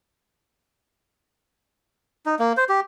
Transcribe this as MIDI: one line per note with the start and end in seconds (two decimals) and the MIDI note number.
2.26 2.35 63
2.39 2.53 58
2.57 2.64 72
2.69 2.80 67